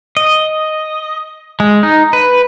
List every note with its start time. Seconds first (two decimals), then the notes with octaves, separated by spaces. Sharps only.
0.17 D#5
1.60 G#3
1.83 D#4
2.13 B4